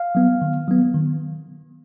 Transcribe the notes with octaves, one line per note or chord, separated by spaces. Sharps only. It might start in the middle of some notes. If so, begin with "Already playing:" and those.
Already playing: F5
F#3 B3
D#3
F#3 B3
D#3